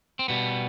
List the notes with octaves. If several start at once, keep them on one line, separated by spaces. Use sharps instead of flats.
C4
B2 G3 B3